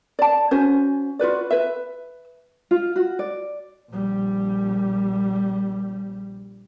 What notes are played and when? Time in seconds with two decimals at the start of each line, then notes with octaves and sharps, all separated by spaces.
0.19 D5 A5
0.51 C#4 F#4 C5 G#5
1.19 F4 F#4 B4 D5
1.50 B4 E5
2.71 F4
2.96 F#4
3.19 D5
3.90 A#1 G3